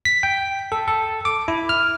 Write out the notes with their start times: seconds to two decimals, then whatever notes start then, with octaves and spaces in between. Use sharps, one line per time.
0.05 B6
0.23 G5
0.72 A4
0.88 A4
1.25 D6
1.48 E4
1.69 F6